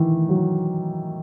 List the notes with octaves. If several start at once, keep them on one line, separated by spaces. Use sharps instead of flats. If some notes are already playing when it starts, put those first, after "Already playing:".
Already playing: D#3 E3
F#3